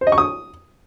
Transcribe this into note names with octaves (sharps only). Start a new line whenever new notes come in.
C5
D#5
C#6
D#6